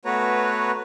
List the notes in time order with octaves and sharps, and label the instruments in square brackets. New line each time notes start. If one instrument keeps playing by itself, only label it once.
[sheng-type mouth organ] A3 B3 F#4 B4 C#5 A#5